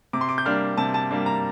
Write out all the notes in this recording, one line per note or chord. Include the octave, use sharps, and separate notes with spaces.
C3 D6
C6
D6
G6
G3 A#3 D4 F6
C3 A5
A5
G3 A#3 D4
A#5